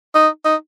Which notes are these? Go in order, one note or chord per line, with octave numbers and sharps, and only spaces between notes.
D#4
D#4